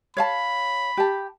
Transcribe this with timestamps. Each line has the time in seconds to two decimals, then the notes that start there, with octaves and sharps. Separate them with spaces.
0.17 C#5 F5 A5 B5
0.97 G4 A5